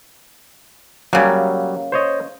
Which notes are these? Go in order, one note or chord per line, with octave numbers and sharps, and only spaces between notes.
C#3 F#3 G3 A#3
C5 C#5 D#5